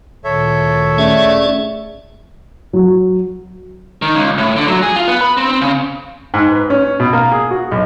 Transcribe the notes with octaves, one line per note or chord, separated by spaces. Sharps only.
D2 A#2 D#3 A4 C#5 E5
A3 C#4 G#4 D5
F#3
D#3
C#2
A2
D3
F#3
G#4
F4
B3
B5
C4
C4
C#3
G#2
B4
C#4
B2
A#3
G#4
F#4
B1